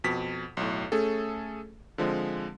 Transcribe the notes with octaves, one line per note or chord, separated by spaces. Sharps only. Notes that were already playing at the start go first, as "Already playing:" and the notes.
F2 B2 B6
B1 A2
A3 C#4 G#4 A4
D3 F3 G#3 C4